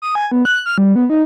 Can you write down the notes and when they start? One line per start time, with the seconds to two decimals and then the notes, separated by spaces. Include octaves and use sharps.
0.02 D#6
0.15 G#5
0.32 B3
0.45 F#6
0.66 F6
0.78 G3
0.96 B3
1.10 D#4